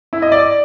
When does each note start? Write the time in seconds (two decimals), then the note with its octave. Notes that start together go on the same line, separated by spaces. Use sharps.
0.13 E4
0.22 D#5
0.32 D5